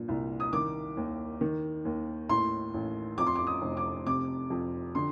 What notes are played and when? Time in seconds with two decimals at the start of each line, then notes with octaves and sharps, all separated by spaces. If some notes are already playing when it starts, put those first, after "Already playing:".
Already playing: G2 A#2
0.08 C2
0.40 D#6
0.53 D#3 D6
0.97 D#2
1.41 D#3
1.85 D#2
2.29 A2 C6
2.74 A1
3.18 F2 D6
3.27 C6
3.36 D6
3.47 D#6
3.62 F1
3.77 D6
4.06 C3 D6
4.50 F2
4.95 D3 C6